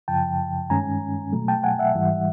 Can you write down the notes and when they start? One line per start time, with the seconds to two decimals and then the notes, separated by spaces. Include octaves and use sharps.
0.08 F#2 C#3 F3 G5 A5
0.70 G2 D#3 G#3 C#4 G#5 A#5
1.33 B2 F#3 A3
1.48 G5 A5
1.64 F#5 G#5
1.79 E5 F#5
1.95 G#2 E3 G3